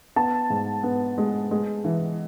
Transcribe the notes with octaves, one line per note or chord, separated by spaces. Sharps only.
B3 A5
G#2
B3
G#3
G#3
E3